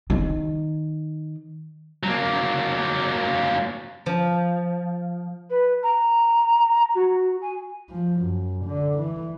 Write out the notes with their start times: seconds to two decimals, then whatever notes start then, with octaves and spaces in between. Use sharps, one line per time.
0.10 D#3
2.03 F#3 A#3
4.06 F3
5.50 B4
5.83 A#5
6.95 F#4
7.42 G#5
7.90 F3
8.21 F#2
8.65 D3
8.98 E3